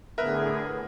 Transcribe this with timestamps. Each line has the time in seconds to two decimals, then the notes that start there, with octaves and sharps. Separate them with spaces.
0.18 A2 D3 B3 G#4 A#4 B4 E5